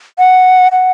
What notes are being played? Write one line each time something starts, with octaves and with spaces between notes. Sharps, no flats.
F#5
F#5